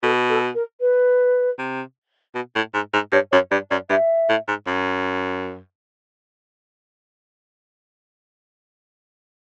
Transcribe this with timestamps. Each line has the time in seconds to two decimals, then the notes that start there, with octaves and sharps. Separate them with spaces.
0.03 B2 A4
0.29 A4
0.55 A#4
0.81 B4
1.58 C3
2.35 B2
2.55 A2
2.74 G#2
2.93 G#2
3.12 G2 C#5
3.32 F#2 C#5
3.51 G2 D5
3.71 F#2 D5
3.89 G2 E5
4.29 A2
4.48 G#2
4.67 F#2